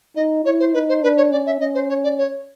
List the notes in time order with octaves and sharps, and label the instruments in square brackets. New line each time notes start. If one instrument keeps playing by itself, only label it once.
[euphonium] D#4 [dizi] D#5
[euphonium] E4 [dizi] C#5
[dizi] C5
[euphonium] D#4 [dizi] B4
[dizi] C5
[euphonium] D4 [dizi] B4
[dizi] C#5
[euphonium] C#4 [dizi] D5
[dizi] E5
[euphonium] C#4 [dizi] D#5
[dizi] C5
C#5
D5
C#5